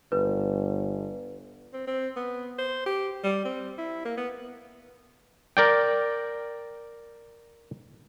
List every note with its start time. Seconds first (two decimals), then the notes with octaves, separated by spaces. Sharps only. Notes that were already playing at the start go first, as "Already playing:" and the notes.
0.12 G1 B4
1.73 C4
1.87 C4
2.16 B3
2.58 C5
2.86 G4
3.24 G3
3.45 C4
3.78 E4
4.05 A#3
4.17 B3
5.57 A#4 D5 G5